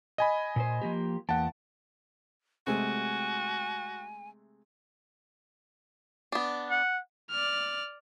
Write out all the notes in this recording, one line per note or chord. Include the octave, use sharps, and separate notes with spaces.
D#5 G#5 B5
A#2 B4 C5
F3 A#3 G4
E2 A#3 F#5 G5 A5
C3 G#3 A3 F#4 G#5
B3 D4
F#5
D5 F6